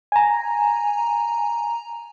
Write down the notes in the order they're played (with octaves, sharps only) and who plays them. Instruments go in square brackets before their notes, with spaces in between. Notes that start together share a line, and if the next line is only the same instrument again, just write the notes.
[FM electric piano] G#5 A#5